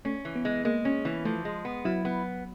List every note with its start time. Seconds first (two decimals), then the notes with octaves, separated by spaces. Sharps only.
0.05 A3 C#4
0.25 E3
0.36 B3
0.45 G#3
0.65 G#3 A#3
0.85 C#4
1.05 E3
1.25 F3 A3
1.45 G#3
1.65 B3
1.85 F#3 E4
2.05 B3